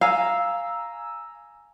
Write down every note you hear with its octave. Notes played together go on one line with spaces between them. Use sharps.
F5 G#5 A#5 E6